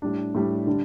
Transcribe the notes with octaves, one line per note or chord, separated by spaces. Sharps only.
A2 G3 D4
A2 G3 D4
D3 G3 D4